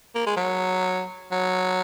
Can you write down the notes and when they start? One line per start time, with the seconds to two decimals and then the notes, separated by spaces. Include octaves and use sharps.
0.15 A#3
0.26 G#3
0.37 F#3
1.31 F#3